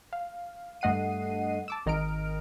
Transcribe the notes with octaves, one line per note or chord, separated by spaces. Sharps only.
F5
G2 A3 D#5 F#5 C7 D#7
A5 D6 E6
G#1 D#3 D#5 A#5 F6 D7